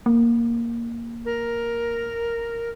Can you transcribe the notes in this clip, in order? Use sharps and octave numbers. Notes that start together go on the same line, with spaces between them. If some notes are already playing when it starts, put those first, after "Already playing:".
A#3
A#4